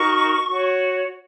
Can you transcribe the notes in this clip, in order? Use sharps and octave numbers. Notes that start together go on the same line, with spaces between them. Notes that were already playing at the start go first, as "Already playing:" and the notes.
Already playing: D#4 F#4 A#4 C#6
F#4 C#5